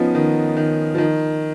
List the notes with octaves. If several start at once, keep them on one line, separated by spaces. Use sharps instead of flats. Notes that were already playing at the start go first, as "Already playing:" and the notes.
Already playing: F3 B3 C#4 D#4
D#3
D#3
F3
D#3